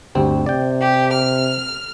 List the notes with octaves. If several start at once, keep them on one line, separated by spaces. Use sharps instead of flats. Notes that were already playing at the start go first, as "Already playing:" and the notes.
G1 D2 C4 G4
C3 D5 G5
G4
F6